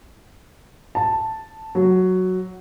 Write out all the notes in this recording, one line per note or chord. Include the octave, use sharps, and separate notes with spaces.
A5
F#3